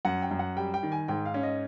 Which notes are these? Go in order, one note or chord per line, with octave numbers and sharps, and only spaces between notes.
F#2 F#5
G5
F#2
F#5
G3 G5
G5
D#3
G#5
G#2 G5
F5
C#4
D#5